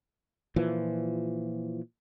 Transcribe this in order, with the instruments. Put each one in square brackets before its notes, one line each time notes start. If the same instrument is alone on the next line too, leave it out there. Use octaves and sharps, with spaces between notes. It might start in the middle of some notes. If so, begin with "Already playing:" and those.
[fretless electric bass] A#2 E3 F3